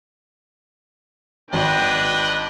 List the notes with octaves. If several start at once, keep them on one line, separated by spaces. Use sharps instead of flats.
G#1 D4 B4 D#5 G5